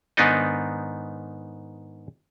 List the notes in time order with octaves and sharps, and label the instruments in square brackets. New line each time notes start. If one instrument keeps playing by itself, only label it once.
[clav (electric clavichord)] G#2 D#3 B3 D4 D#4 D#5